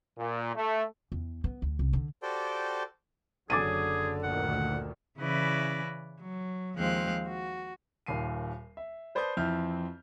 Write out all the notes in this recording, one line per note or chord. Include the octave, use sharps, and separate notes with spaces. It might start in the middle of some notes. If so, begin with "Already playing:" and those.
A#2
A3
E2
B3
D2
C2
D3
F#4 G4 A4 C5 D5 G5
F#1 D3 F#3 G#4 D6 A6 D#7
D2 A#2 D#3 F#5
C#3 E3 E4 B4 D5 A#6
F#3
D#2 F3 G#3 C4 F5 F#6
F#4
D#1 D#2 C7 D#7
E5
B4 C5 D5 A5 D#6 G6
F2 E3 C4 E5 F6 G6